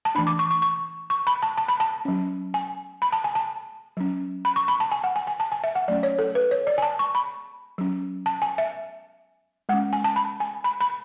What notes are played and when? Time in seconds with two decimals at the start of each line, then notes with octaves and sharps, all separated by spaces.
0.05 A5
0.15 E3 A3 D4 B5
0.27 D6
0.39 C#6
0.51 C#6
0.62 C#6
1.10 C#6
1.27 B5
1.42 A5
1.58 A5
1.69 B5
1.80 A5
2.05 F#3 C#4
2.54 G#5
3.02 B5
3.12 A5
3.24 G#5
3.35 A5
3.97 F#3 C#4
4.45 B5
4.56 C#6
4.68 B5
4.80 A5
4.92 G#5
5.04 F#5
5.16 G#5
5.27 G#5
5.40 A5
5.52 G#5
5.64 E5
5.75 F#5
5.88 F#3 A3 C#4 D5
6.03 C#5
6.19 A4
6.35 B4
6.51 C#5
6.67 D5
6.78 G#5
6.82 A5
6.99 C#6
7.15 B5
7.78 F#3 C#4
8.26 A5
8.42 G#5
8.58 E5
9.69 G#3 C#4 F#5
9.93 G#5
10.04 A5
10.16 B5
10.40 G#5
10.64 B5
10.81 B5